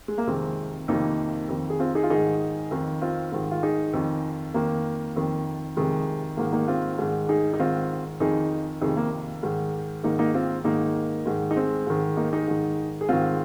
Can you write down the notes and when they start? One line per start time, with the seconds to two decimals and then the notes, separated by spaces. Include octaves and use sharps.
0.08 G#3
0.18 A#3
0.27 F2 C3 D#3 G#3 C4
0.88 F2 C3 D#3 A#3 D#4
1.49 F2 D#3
1.70 G#4
1.80 C4 F4
1.95 D#4 G#4
2.03 F4
2.10 G#2 D#3 D#4 G#4
2.71 F2 D#3
3.01 C4 F4
3.32 G#2 D#3
3.51 F4
3.63 D#4 G#4
3.94 F2 D#3
4.54 F2 D#3 A#3
5.16 F2 D#3
5.77 F2 C3 D#3 G#3
6.37 G#2 D#3 A#3
6.53 A#3 D#4
6.68 C4 F4
6.99 G#2 D#3
7.29 D#4 G#4
7.54 D#4
7.59 G#2 D#3 C4 F4
8.20 F2 D#3 D#4 G#4
8.81 F2 C3 D#3 D#4 G#4
8.97 A#3
9.43 G#2 D#3
10.04 G#2 D#3 A#3 D#4
10.19 A#3 D#4
10.34 C4 F4
10.64 G#2 D#3 A#3 D#4
11.26 G#2 D#3
11.51 D#4
11.56 G#3 C4
11.87 G#2 D#3
12.17 A#3 D#4
12.33 D#4 G#4
12.48 G#2 D#3
13.01 G#4
13.09 G#2 D#3 C4 F4